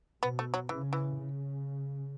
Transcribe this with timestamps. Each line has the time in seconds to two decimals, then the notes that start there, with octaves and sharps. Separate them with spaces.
0.23 B2 B3
0.39 A3
0.54 F#3
0.69 C#3 E3
0.93 E3
1.17 C#3